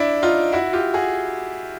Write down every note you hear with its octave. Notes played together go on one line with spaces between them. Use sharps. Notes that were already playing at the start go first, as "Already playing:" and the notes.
Already playing: D4 E4
D#4 F4
E4 F#4
F4 G4
F#4 G#4